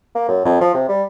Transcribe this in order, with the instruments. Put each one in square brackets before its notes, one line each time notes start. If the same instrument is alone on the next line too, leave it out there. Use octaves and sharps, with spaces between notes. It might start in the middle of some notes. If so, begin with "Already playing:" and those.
[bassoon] A#3
F#2
F2
F3
C3
G3